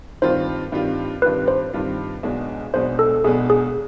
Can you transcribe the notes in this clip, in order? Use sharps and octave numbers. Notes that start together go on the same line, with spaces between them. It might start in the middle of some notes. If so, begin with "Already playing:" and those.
G2 D#3 G3 C4 F4 C5
G2 D#3 G3 C4 F4
G2 D#3 G3 C4 F4 B4
C5
G2 D#3 G3 C4 F4
B1 B2 G#3 B3 D4
B1 B2 G#3 B3 D4 C5
A4
B1 B2 G#3 B3 D4 G#4
G#4